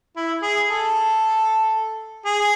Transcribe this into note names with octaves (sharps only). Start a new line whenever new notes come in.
E4
G#4
A4
G#4